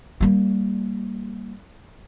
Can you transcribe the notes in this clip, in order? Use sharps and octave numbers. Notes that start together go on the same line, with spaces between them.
G3 A#3